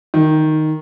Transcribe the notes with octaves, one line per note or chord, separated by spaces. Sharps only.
D#3